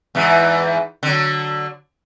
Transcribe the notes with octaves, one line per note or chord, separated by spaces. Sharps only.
E2 G#2 E3
D3 F#3